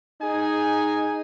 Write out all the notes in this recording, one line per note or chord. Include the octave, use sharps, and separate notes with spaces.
D#4 G#4 G#5